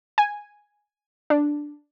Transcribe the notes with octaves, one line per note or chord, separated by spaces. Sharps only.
G#5
D4